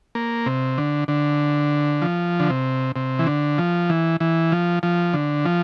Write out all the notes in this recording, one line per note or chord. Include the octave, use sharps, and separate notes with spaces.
A#3
C3
D3
D3
F3
D3
C3
C3
E3
D3
F3
E3
E3
F3
F3
D3
F3